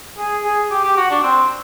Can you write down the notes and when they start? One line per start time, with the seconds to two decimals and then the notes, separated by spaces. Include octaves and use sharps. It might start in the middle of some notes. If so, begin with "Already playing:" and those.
0.18 G#4
0.44 G#4
0.71 G4
0.84 G4
0.97 F#4
1.10 D4
1.24 C4